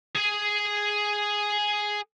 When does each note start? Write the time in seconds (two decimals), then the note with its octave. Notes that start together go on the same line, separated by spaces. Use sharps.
0.15 G#4 G#5